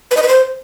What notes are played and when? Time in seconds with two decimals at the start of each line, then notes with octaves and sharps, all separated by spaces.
0.11 B4
0.17 D#5
0.23 B4
0.28 C5